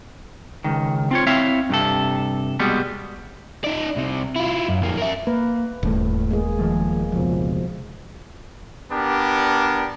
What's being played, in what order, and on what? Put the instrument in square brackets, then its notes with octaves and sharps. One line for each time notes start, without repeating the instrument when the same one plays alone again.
[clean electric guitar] C#2 D#3
C4 F4 C#5
C4 E4 C#5 E5 F5
G2 C3 A4
B2 G3 G#3 B3
[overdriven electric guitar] D#4 D5
C2 C3
E4 F4
F#2
F2 A#3
A#4 E5
[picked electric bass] A#3 [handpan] B4
[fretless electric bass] D#1 [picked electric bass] G#2 A3
[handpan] G#3 A#3 G#4
[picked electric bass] D#3 F3 A3
[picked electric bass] F1 C#2 [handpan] B2 F3
[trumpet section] B3 D4 G4 A#4